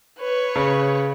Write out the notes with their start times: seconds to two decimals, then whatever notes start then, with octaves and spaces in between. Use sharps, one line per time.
0.19 B4 C#5
0.56 C#3